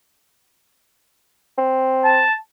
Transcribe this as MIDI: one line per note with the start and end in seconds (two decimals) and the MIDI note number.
1.58 2.23 60
2.05 2.35 81